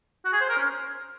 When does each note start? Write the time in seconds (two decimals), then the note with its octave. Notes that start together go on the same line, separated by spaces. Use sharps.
0.25 F#4
0.33 G#4
0.41 C5
0.49 A#4
0.57 C#4